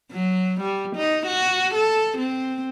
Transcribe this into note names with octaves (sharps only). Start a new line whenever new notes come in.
F#3
G3
D#4
F#4
A4
C4